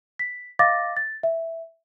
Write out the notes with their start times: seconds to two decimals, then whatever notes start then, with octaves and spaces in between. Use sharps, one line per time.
0.19 B6
0.59 D#5 F5 D6 A6 A#6
0.97 A6
1.23 E5